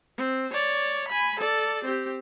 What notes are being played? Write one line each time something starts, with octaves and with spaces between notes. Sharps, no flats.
C4
C#5 D5
G#5 B5
A4 D5
C4 G4